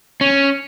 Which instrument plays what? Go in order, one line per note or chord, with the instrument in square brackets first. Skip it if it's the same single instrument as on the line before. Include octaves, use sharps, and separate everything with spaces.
[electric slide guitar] C#4